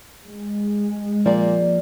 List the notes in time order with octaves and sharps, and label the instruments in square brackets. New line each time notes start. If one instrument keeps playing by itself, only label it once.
[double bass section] G#3
[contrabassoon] A#2 [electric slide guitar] F3 A#3 [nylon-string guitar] D5